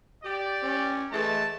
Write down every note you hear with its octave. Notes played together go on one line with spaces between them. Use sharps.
G4 D5
C#4
E3 G#3 A3 A5